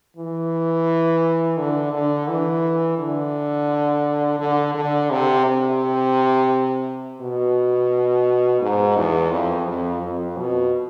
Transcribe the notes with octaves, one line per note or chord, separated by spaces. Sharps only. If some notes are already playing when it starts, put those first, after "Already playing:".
E3
D3
D3
E3
D3
D3
D3
C3
C3
B2
G#2
E2
F2
F2
F2
B2